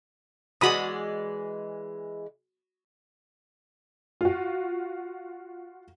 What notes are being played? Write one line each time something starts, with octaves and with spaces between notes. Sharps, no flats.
E3 G#3 F#4 D5 B5 D#6
F4 F#4